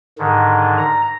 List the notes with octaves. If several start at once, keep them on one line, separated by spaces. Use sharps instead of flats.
G#2 D3 D#3
A#5